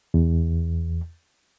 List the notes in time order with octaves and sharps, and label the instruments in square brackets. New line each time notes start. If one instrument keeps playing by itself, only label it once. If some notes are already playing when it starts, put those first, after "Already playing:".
[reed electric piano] E2